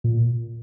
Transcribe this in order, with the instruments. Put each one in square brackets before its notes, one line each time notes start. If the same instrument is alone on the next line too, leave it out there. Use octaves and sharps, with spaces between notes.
[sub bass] A#2